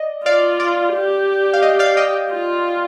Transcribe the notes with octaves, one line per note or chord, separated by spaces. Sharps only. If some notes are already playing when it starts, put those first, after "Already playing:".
Already playing: D5 D#5
F4 D5 F5
D5
G4
F5
D#5
D5 F5
D#5 G5
F4